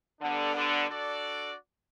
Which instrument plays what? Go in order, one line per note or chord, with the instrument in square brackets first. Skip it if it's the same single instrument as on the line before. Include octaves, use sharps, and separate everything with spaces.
[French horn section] D3 [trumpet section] G3 B3 D4
[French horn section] D3
[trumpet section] D4 F#4 A4 D5